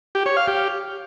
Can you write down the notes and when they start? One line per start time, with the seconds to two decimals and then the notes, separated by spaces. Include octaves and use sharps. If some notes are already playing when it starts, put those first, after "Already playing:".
0.15 G4
0.26 C#5
0.37 F5
0.48 G4